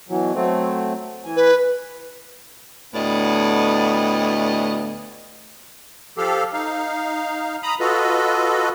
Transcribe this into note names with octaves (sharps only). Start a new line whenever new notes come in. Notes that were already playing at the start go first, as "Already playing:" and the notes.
B2 E3 F#3
F#3 A3 C4
E3 G#5
B4
D2 A2 B3 D5 D#5
F3 G4 A4 F5
D#4 F5
A#5 B5 D#6
F4 F#4 A4 B4 D#5